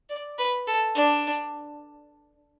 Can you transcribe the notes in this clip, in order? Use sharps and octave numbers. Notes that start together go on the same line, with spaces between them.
D5
B4
A4
D4